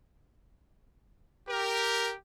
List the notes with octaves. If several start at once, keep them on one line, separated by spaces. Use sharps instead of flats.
G4 A#4